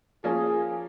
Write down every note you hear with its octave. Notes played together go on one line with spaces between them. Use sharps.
F3 A#3 C#4 G#4